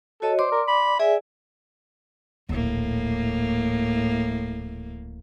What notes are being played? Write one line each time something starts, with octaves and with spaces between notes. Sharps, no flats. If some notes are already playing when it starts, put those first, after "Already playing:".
F#4 A4 C#5 D#5
C5 D5 C6 D6
A#4
B5
G#4 D5 E5 G#5
D1 A#1 A2 A#3